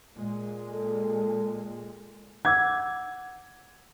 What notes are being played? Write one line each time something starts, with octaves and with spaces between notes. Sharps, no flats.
A#2 G#3
A4
F#5 D6 E6 G#6